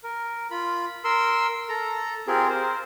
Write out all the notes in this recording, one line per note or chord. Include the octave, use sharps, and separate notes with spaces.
A#4
F4 B5
A#4 C6 E6
A4 A#5
C4 F4 G4 G#4 A#4
A#4 C5